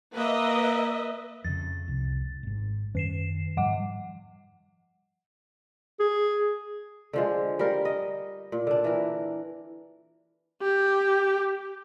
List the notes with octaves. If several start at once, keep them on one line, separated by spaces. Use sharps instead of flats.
A#3 B4 D#5 E5
F2 C#3 A6
C2
G#1 G#2
F#2 D#3 C#4 C7 E7
G#2 F3 G3 F#5 D6
G#4
D3 F3 G#3
G3 A#4 F5
D#5
A#2
D3 D4
E3 A#4
G4